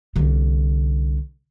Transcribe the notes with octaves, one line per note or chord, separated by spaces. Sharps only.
C2 D3